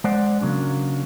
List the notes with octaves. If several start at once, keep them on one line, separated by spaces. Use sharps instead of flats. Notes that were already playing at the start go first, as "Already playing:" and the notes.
G#3 C5 D5 F#5
C#3 F#3 A#3 D4